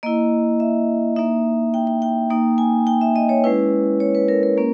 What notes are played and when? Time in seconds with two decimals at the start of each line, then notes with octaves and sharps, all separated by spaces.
0.03 A#3 E4 D#5
0.60 E5
1.16 A#3 D#4 E5
1.74 G5
1.87 G5
2.02 G5
2.30 A#3 D#4
2.58 G#5
2.87 G5
3.01 E5
3.16 D#5
3.29 C#5
3.44 G#3 C#4 E4 B4
4.00 C#5
4.15 B4
4.28 A#4
4.43 A#4
4.58 A#3 C#4